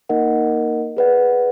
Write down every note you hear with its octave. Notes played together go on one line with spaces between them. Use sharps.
A#3 D#4 A#4 D#5 F#5
G#4 B4 D5 F#5